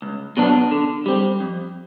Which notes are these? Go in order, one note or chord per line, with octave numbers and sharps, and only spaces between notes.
C#2
B2 F#3 B3 D4
D3
G3 C4
F2